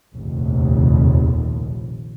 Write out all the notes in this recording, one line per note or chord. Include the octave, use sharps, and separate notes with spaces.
F1 A#1 D#2